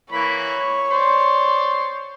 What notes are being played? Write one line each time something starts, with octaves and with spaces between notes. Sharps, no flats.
E3 A#3 C#5 B5
C5 D5 C6